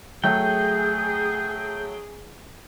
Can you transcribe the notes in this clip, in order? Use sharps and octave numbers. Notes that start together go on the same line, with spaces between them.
F#3 A3 G#4 G5 G6